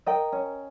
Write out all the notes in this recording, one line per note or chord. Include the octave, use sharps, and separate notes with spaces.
A#4 D#5 G5
C#4